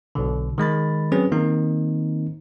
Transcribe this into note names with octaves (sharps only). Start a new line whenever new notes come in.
B1 B2 D3
D#3 G#3 B5 A6
F#3 C4 C#4 G#4 B4
D#3 A#3 C4 D#4